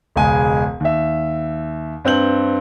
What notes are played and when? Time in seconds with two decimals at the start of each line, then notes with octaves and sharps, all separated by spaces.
0.16 E1 C#2 G#3 G#5
0.80 D#2 E5
2.05 G2 C4 B4 G6 F#7